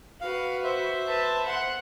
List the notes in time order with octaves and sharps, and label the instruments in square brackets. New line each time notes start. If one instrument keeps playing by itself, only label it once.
[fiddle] F#4 B4 [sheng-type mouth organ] F5
[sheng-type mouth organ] C5 E5
[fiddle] B4 A5
F#5 C6